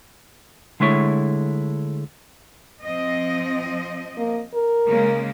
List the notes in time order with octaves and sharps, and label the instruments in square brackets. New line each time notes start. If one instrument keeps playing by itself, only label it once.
[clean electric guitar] D3 G#3 A3 E4 C#5
[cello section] F3 C4 D#5
[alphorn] A#3
A#4
[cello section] C#3 G#3 A#3